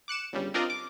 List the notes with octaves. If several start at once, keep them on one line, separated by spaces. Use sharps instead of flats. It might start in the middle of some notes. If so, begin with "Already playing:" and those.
D6 F#6 C#7 E7
G1 C#3 G3
C4 D4 F4 A#4 D5 D#5
D6